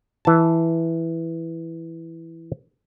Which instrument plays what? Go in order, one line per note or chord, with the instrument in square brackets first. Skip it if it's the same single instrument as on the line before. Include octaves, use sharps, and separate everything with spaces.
[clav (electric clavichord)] E3 A5